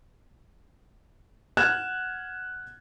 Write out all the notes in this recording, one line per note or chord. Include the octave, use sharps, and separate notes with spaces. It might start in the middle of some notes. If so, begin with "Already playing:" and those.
F#5 F6 F#6 G#6 A6 E7